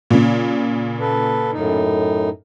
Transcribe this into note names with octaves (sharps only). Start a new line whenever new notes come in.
A#2 C#3
A4 B4
F#2 A2 D#4